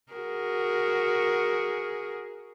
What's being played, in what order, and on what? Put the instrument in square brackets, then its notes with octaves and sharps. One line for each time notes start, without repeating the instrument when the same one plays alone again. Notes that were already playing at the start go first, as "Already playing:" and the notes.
[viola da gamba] F#4 G#4 A#4